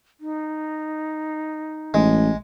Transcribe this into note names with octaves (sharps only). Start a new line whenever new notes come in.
D#4
A1 G#3